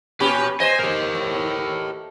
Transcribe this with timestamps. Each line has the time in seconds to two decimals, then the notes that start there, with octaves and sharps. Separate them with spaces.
0.20 A#2 C#4 G4 B4 B5
0.60 C5 D#5 G#5
0.79 G4 A#4
1.15 A2